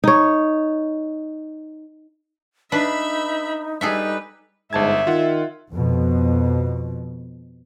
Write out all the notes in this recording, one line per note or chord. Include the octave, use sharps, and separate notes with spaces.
D#4 C#5
D4 D#4 B4 E5 B5
G3 D#4 G#4 A4 B4 E5
G1 G#2 E5 A5 G#6
D#3 F4 F#5
F2 B2